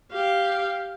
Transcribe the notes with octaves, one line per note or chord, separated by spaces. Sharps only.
G4 F5